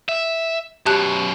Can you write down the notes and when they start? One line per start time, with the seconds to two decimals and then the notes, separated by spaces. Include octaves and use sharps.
0.09 E5
0.86 F#2 B2 G4 A5 F#6